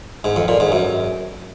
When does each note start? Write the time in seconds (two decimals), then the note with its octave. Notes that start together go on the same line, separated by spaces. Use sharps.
0.24 G#2
0.36 F2
0.48 A#2
0.60 G#2
0.72 F#2